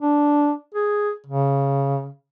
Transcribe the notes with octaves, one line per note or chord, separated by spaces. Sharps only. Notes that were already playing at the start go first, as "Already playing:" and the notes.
D4
G#4
C#3